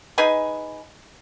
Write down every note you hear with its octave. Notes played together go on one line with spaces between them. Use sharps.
D#4 G#4 B4 G#5